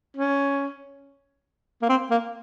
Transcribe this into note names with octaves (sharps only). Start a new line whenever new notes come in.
C#4
A#3
C4
A#3